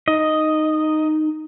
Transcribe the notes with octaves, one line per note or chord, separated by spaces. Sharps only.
D#4 D#5